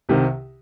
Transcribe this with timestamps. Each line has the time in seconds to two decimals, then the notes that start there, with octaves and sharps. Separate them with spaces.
0.09 C2 C3 D#3